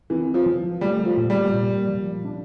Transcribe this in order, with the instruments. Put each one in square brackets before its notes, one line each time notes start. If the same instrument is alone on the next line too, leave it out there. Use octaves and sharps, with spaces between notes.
[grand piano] E3 [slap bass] C4
[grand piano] F3
[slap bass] F3
[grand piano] G3 [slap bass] A3
[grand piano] F3
[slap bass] A#2
[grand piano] G3
[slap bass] A#2
F3
D4